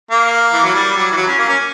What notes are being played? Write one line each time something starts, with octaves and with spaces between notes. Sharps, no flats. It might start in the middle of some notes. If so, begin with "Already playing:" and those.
A#3
E3
F#3
G3
F#3
E3
F#3
C#4
A#3
C#4